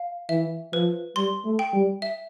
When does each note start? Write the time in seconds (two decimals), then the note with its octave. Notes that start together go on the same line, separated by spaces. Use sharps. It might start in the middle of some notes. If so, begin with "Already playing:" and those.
Already playing: F5
0.29 E3 E5
0.72 F3 B4
1.16 G3 C6
1.45 A3
1.59 G5
1.73 G3
2.02 E5